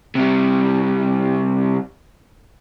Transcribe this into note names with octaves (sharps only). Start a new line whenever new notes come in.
C3 G3